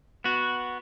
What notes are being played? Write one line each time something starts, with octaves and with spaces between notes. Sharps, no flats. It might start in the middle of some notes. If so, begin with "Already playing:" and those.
B3 F#4